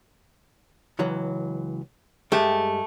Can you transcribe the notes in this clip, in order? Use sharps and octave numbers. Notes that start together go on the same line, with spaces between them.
C#2 E3 F#3
G2 G#3 A3 G4